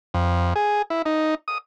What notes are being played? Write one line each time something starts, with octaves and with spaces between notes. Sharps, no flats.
F2
G#4
E4
D#4
D#6